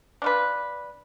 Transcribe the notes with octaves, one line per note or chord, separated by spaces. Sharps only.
D4 F4 B4